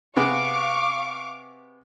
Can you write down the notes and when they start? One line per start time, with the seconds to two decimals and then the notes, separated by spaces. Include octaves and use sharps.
0.16 C3 B3 G#4 F5 C#6 D6